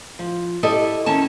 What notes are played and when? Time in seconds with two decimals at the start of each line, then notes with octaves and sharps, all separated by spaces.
0.19 F3
0.63 E4 G4 A4 D5 D#5
1.06 D#3 C#4 E4 A5